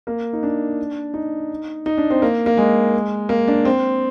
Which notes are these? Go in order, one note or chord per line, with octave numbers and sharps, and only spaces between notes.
A#3
D#4
D4
D#4
D#4
D4
C4
A#3
A#3
G#3
A#3
D4
C4